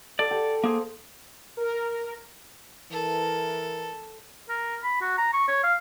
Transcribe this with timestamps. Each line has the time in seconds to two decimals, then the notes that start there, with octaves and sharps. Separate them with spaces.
0.19 A4 D5
0.31 G4 A5
0.64 A#3 G#4 C5
1.57 A#4
2.91 E3 A4 A#4
4.49 A#4
4.84 B5
5.01 F#4
5.18 A#5
5.33 C#6
5.48 C#5
5.64 F5